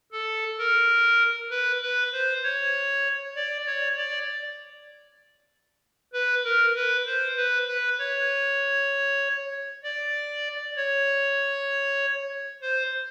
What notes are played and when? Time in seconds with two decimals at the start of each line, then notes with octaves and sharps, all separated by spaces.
0.12 A4
0.59 A#4
1.50 B4
1.82 B4
2.12 C5
2.43 C#5
3.36 D5
3.67 C#5
3.97 D5
6.13 B4
6.44 A#4
6.75 B4
7.06 C5
7.36 B4
7.68 B4
7.99 C#5
9.84 D5
10.76 C#5
12.61 C5